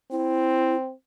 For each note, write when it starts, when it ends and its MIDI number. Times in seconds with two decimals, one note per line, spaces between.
0.12 0.93 60
0.12 0.76 64